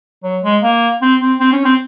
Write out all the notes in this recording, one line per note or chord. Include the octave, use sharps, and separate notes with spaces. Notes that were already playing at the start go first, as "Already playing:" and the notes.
F#3
G#3
A#3
C4
C4
C4
C#4
C4